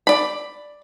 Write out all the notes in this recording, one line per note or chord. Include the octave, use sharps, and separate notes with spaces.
D5 B5